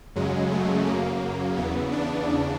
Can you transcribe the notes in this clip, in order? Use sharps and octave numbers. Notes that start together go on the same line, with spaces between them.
F#2 C#3 F#3 G#3
A3
F#2 C#3 F#3 A#3
E2 C#3 E3 B3
D4
E2 C#3